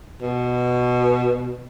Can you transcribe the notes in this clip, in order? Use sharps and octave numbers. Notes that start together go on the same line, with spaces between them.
B2